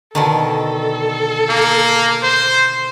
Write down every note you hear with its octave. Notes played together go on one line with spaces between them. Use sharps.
B2 D3 D#3 A4
A#3
C5